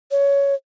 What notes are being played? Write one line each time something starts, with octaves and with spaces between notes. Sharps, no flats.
C#5